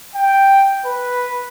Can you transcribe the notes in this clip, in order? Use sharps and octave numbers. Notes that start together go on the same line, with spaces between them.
G5
B4